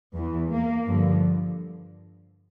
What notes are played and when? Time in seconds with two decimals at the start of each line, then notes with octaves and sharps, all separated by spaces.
0.14 E2 E3
0.50 A#3
0.86 G2 D3 F3